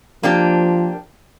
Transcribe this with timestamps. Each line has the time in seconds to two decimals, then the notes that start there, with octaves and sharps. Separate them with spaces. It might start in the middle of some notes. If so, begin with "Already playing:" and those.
0.23 F3 A#3 D4 G4